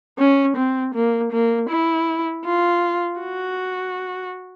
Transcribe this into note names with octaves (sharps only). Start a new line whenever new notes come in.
C#4
C4
A#3
A#3
E4
F4
F#4